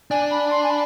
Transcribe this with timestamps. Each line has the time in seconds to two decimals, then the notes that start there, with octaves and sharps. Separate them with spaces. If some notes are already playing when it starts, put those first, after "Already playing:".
0.11 D4 G#5
0.31 B5
0.51 C6
0.63 G#5
0.70 B5